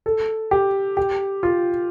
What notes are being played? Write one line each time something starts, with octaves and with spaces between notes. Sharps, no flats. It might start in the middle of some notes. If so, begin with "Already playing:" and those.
A4
G4
G4
F4